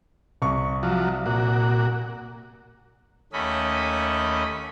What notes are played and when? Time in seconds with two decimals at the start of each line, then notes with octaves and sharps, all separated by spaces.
0.42 C2 C#6
0.83 F3 F#3
1.26 A#2 F#4
3.33 D#2 A3 C#4 D#5 B5